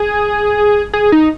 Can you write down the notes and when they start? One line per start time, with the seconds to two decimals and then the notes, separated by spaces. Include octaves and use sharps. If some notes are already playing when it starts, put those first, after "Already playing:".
Already playing: G#4
0.93 G#4
1.12 D#4